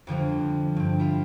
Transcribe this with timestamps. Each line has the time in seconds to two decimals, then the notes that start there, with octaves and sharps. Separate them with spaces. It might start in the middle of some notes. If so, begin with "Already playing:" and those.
0.07 F2 D3 F3 G3
0.76 G2 C4
0.99 E4 F4